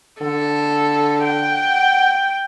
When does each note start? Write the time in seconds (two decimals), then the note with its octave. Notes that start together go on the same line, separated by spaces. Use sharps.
0.22 D3 A4
1.24 F#5 G5